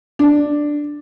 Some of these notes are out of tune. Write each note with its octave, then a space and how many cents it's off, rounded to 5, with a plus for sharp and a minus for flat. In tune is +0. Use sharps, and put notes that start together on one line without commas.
D4 +5